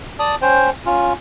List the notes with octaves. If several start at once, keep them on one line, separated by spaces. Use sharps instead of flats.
D5 A5 D#6
C#4 C5 G5
C#4 F4